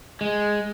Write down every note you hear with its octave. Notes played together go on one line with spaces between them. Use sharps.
G#3